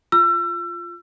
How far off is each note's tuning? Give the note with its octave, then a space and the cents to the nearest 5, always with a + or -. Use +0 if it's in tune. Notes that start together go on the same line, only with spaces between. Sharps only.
F4 -5 E6 +35